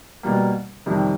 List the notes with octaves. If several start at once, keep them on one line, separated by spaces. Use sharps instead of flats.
B2 G3 A#3
F2 C3 D#3 G3